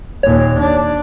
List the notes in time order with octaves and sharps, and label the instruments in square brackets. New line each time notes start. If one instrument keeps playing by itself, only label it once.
[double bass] D#2 A#2 [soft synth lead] C#5
[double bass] D4